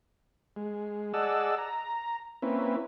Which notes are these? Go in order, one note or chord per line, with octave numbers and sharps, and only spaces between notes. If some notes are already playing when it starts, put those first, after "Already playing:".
G#3
G#4 D5 D#5 F#5 A5 E6
A#5
A#3 C4 C#4 E4 B4